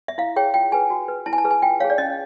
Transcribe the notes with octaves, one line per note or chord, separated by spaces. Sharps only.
E5
E4 F5
G#4 C#5 G5
F4 G5
G#4 B4 G#5
F#4
B4
E4 A5
G#5
A5
G#4 B4
G#5
F4 G5
G#4 C#5 F5
D5
C#4 D#5